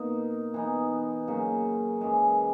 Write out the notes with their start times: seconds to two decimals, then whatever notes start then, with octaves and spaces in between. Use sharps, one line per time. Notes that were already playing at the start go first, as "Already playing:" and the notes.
Already playing: B2 A#3 D#4
0.54 E3 B3 D#4
1.28 C#3 F#3 A#3
2.01 F#2 E3 G#3